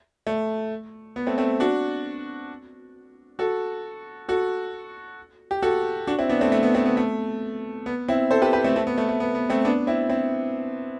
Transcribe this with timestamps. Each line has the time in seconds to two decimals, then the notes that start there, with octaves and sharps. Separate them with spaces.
0.27 A3
1.16 B3
1.27 A3 C4
1.38 A3 C4
1.60 D4 F#4
3.39 F#4 A4
4.28 F#4 A4
5.51 G4
5.62 F#4 A4
6.07 D4 F#4
6.18 C4 E4
6.29 B3 D4
6.41 A3 C4
6.52 A3
6.63 B3
6.75 A3 C4
6.86 B3
6.97 A3
7.86 B3
8.08 C4 E4
8.31 A4 C5
8.42 G4 B4
8.53 G4 B4
8.64 A3 C4
8.76 A3 C4
8.87 B3
8.98 A3
9.09 A3
9.20 B3
9.35 B3
9.50 A3 C4
9.65 B3 D4
9.87 C4 E4
10.09 C4 E4